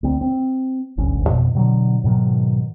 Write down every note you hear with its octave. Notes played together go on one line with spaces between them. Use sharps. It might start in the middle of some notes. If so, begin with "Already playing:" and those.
D2 C4
C4
D#1 G#1 D2 C#4
F2 B2 D#3
B2 D3 F#3
G#2 B2 D#3 F#3